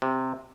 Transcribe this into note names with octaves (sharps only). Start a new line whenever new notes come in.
C3